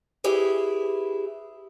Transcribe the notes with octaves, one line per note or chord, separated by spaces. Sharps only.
E4 G4 G#4 B4